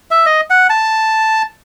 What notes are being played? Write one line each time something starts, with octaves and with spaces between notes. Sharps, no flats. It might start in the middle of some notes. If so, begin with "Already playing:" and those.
E5
D#5
F#5
A5